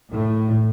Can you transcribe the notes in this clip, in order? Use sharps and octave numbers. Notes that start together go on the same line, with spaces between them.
A2